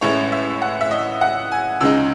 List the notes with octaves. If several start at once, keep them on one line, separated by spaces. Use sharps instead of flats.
A1 A2 G#3 C#4 E4 C#5
E5
F#5
E5
D#5
F#5
G#5
C#2 C#3 G#3 D#4 E6